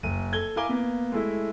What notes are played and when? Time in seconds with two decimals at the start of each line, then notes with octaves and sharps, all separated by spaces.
0.03 F#1 D#7
0.32 A4 G#6 G7
0.56 E4 A#4 F5 G#5 D6 G7
0.69 A#3 B3
1.12 G#3 A3 E4